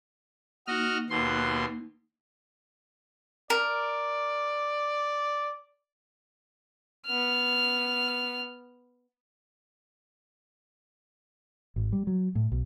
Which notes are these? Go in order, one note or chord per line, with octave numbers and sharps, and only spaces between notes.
A#3 D#4 F#4 D#5 F6
D#2 B2 C6
A#4 D5
B3 F6
G#1
G3
F#3
A2
B1